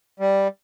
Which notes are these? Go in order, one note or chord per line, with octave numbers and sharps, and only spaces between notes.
G3